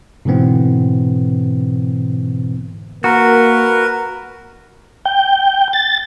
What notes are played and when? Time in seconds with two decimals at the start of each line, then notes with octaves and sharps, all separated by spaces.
0.25 G#2 B2 D3 E3 B3 C4
3.04 A#3 F#4 A#4 B4
5.06 G5
5.73 A6